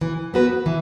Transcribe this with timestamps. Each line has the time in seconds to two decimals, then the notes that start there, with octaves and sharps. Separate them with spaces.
0.01 E3
0.34 B3 F#4 B4
0.66 E3